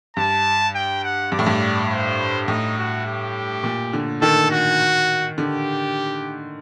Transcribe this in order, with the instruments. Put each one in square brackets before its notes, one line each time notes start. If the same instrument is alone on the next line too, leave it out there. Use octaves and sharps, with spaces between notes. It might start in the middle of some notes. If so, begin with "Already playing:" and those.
[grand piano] G2 [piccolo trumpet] A5
[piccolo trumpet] G5
F#5
[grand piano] G2 [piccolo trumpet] D5
[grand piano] A2
G2
[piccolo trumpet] C5
[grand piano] A2 [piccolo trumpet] D#4
[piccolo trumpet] F#4
G4
[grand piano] A#2
D3
[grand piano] D#3 [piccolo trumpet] A4
[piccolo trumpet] F#4
[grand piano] D3 [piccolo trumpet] G4